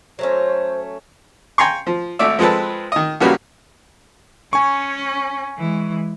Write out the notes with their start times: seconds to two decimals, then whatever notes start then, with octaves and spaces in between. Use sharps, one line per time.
0.19 F#3 A3 C#4 C5
1.58 G5 G#5 A#5 C6 C#6
1.87 F3
2.19 G#1 A3 D5 E5
2.39 F3 G#3 C4 A4 B4
2.92 D#3 D#5
3.20 A#1 C#3 G3 A#3 F#4 B4
4.53 C#4 G#5 C#6
5.58 E3 G#3